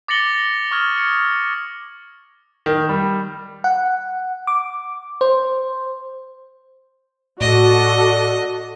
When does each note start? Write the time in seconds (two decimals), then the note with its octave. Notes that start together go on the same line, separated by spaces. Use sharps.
0.08 D6 A6 A#6 C#7 F#7 G7
0.35 A#6
0.71 C#6 D#6 F6 G#6 G7
0.98 C#7 G7
2.66 D#3
2.89 G3
3.64 F#5
4.47 D6
5.21 C5
7.41 A2 F#4 A4 D5 D#5